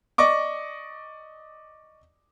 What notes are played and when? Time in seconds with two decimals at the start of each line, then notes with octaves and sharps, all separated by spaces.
0.18 D5 D#5 C#6 D6